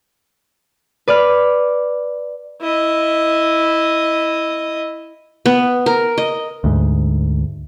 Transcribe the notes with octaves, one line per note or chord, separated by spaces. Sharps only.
B4 D5 B5 F6
E4 D#5
B3
A#4
D#5
D2 G#2